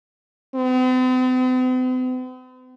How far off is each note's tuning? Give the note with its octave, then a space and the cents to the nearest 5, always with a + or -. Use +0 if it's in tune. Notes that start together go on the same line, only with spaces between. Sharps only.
C4 -45